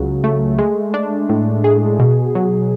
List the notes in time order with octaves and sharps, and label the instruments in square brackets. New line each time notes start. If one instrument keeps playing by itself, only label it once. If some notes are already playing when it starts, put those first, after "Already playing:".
Already playing: [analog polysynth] C#2 C#3 F#3
A3
G#3
D4
A2
G#4
B2
F#3